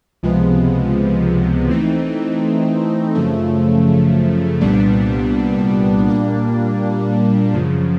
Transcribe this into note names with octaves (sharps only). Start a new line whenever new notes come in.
C#2 C3 F3 G#3 B3
E3 A3 C4 D#4
F#2 C#3 F3 A3
C2 A#2 G3 B3 D4
A#2 G3 A#3 D4
F#2 C#3 F3